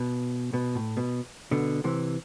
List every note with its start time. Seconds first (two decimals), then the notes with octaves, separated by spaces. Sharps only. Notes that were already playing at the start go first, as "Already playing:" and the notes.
Already playing: B2
0.53 B2
0.75 A2
0.97 B2
1.51 B2 D3
1.84 C3 E3